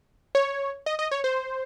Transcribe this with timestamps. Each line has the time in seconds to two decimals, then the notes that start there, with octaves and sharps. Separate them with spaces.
0.35 C#5
0.86 D#5
0.99 D#5
1.11 C#5
1.24 C5